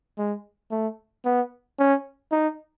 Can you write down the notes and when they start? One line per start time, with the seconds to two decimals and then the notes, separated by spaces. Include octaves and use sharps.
0.18 G#3
0.71 A3
1.25 B3
1.79 C#4
2.32 D#4